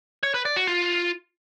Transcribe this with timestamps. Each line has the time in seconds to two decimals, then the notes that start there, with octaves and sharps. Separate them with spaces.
0.23 C#5
0.34 B4
0.45 D5
0.56 F#4
0.67 F4